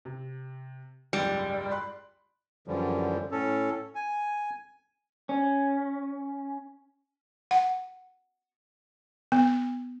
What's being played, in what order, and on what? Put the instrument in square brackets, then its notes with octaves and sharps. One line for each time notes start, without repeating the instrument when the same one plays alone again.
[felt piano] C3
[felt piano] F#1 C#2 G#2 [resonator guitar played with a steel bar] G3
[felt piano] B5 C6 F#6
[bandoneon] F#2 D3 E3 F3 G3
A2 C#4 A4
G#5
[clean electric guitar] C#4
[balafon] F#5
B3